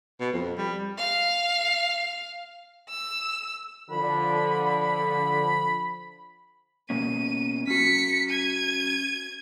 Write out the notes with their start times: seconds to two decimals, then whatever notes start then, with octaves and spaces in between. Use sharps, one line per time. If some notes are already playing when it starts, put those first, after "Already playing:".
0.21 B2
0.33 F2
0.58 G3
0.98 F5
2.90 E6
3.91 D3 F3 B5
6.90 B2 A#3 C#4 D#7
7.67 C#4 F#4 B6 C#7
8.30 G#6 D#7